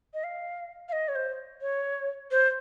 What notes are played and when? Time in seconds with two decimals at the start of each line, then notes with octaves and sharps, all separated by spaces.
0.14 D#5
0.24 F5
0.89 F5
0.92 D#5
1.08 C#5
1.15 C5
1.61 C#5
2.31 C5